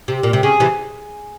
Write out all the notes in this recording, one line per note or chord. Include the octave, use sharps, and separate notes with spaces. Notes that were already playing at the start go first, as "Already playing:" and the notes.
C3
A#2
C3
C#3 G#4
C3 E3